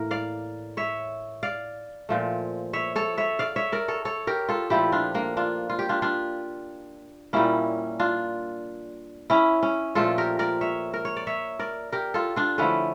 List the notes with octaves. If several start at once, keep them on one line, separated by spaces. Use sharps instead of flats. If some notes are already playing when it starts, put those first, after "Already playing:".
Already playing: A2 E3 A#3 A#4
D5 F5
C#5 E5
D5 F5
A#2 F3 A3
C#5 E5
A4 C#5
C#5 E5
D5 F5
C#5 E5
A#4 D5
A4 C#5
A4 C#5
G4 A#4
F4 A4
A#2 F3 A3 E4 G4
D4 F4
A#3 D4
D4 F4
F4
G4
D4 F4
D4 F4
A#2 G3 A#3 C#4 E4
D4 F4
C#4 E4
C#4
A#2 F3 A3 F4 A4
G4 A#4
A#4 D5
C#5 E5
A#4
C#5
D5
C#5 E5
A#4 D5
G4 A#4
F4 A4
D4 F4
D3 F3 A3 C#4 E4